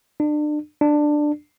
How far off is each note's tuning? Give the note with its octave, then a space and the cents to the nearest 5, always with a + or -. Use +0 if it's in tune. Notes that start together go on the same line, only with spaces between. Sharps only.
D4 +35
D4 +15